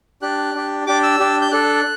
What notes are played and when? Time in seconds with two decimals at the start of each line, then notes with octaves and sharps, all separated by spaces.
0.22 D4 G4 F#6
0.55 D4 G4
0.87 D4 G4 D6
1.03 E6
1.20 D4 G4
1.42 G6
1.51 D4 A4 F#6